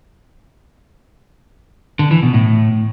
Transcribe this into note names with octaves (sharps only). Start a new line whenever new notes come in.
D3
E3
B2
A2